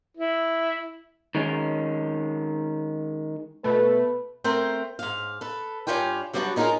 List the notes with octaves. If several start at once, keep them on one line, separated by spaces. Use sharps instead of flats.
E4
D#3 G#3 C#4
B2 A3 B4
A3 C4 A#4 C5 G5
G#2 F5
A4 B4
G2 F3 C#4 D4 F4 G5
F#3 G3 B3 D4 F4 F#4
C#4 D#4 F4 G4 G#4 A#4